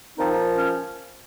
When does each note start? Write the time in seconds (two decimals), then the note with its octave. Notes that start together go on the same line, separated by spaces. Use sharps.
0.17 A#2 F3 C4 D#4
0.57 C#4